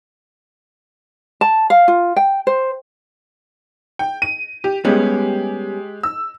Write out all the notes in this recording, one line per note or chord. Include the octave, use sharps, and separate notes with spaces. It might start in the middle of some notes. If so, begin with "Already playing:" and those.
A5
F5
F4
G5
C5
G5
D#7
G4
G3 G#3 B3 C#4 G4
E6